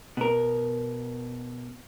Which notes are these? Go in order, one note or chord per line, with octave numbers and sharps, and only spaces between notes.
B2 A#4